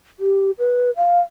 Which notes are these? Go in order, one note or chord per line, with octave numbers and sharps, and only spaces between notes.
G4
B4
F5